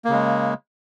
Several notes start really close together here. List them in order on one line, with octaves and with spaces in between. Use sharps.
A#3 C#3 G#3